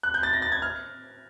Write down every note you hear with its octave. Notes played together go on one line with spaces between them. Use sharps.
F#6
G6
A6
A#6
A6
G#6
F6